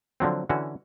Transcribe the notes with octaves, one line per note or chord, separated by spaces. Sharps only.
D3 F3 F#3 C4
D3 E3 C#4 F#4